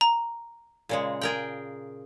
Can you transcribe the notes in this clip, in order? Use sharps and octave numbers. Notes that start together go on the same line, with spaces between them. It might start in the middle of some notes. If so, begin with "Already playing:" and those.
A#5
A#2 C#3 G#3
G#4 A#4 G5